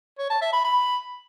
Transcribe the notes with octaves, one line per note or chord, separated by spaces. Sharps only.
C#5
A5
E5
B5
B5